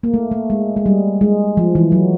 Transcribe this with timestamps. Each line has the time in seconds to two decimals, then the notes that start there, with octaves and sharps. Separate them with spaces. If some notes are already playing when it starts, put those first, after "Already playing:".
0.03 A#3
0.14 A3
0.32 A3
0.50 G#3
0.76 G#3
0.86 G3
1.21 G#3
1.57 F3
1.75 E3
1.92 F#3